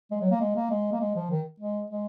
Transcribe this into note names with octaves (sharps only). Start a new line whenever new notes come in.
G#3
F#3
A#3
G#3
A#3
G#3
A#3
G#3
F3
D#3
G#3
G#3